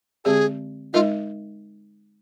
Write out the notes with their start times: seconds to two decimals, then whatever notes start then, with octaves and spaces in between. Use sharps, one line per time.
0.25 D3 G#3 C4 G4 G#4 D5
0.93 G#3 D#4 F4 A#4 D#5